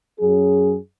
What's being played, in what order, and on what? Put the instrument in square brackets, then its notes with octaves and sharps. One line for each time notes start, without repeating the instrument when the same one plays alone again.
[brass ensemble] F#2 F#3 C#4 G#4